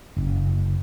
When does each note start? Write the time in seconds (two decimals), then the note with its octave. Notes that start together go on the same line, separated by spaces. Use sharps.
0.17 F#1